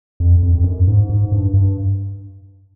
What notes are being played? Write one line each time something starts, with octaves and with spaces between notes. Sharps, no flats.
F2
F2
F2
F#2
G#2
G#2
G2
G2